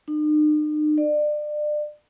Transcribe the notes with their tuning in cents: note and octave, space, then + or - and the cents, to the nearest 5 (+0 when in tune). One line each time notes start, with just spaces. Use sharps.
D#4 -45
D5 +30